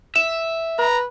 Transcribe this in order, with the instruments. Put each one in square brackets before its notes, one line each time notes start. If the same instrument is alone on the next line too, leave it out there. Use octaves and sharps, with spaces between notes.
[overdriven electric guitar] E5 [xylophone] E7
[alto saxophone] B4 [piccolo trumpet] A#5